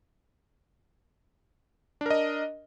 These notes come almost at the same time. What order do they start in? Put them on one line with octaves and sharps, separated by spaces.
D4 A#4 D#5